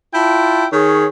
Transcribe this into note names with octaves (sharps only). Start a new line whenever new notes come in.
E4 F4 G5 A5
D#3 G#4 C#5